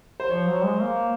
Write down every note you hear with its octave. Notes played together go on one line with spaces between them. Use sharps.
C5
F3 C#5
F#3
G#3
A#3